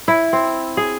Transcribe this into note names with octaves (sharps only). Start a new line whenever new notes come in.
E4
C4
G#4